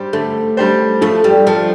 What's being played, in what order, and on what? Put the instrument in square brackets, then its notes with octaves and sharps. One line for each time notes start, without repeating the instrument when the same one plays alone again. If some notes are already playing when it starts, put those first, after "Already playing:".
Already playing: [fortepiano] G3 G4 C5
[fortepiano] D3 [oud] A3
[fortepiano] G3 D4 G4 C5
[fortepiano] F3 [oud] A3
[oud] G3
[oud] F3 [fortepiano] A3 D4 A4